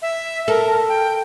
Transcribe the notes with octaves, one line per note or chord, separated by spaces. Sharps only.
E5
A4 A#4
G5